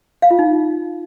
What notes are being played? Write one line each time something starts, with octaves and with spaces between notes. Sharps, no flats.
F5
F4
D#4